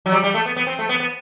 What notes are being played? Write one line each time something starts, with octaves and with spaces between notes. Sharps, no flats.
F#3
G3
G3
A3
B3
B3
C4
A3
B3
B3